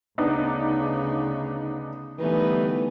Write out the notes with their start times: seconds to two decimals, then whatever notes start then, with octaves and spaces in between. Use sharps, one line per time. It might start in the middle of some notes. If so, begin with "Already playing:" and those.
0.18 D2 C#3 B3 D4 D#4
2.19 D3 E3 G3 A3 B3 D#4 B4